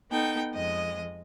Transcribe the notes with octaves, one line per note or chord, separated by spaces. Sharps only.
B3 D#4 A4 G5
F2 G#3 D#5 D#6